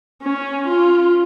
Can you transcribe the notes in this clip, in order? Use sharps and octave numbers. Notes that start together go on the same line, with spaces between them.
C#4
F4